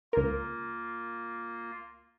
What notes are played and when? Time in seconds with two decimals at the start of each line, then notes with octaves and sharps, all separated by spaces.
0.13 C#2 A#3 F4 A#4